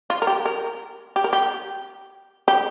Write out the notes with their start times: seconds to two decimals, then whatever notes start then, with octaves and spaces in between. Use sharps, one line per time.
0.10 F4
0.22 A#4
0.27 G4
0.46 A#4
1.16 G4
1.24 A#4
1.33 G4
2.48 G4